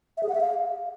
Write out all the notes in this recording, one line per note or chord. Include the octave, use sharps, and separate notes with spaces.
E5
G#4
F#5
E5
F5